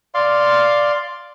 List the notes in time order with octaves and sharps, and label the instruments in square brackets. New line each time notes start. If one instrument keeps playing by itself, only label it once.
[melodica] D5 F5 C6